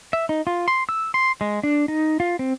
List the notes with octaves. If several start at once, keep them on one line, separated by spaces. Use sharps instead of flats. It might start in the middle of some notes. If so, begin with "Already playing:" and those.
E5
D#4
F4
C6
E6
C6
G#3
D4
D#4
F4
C4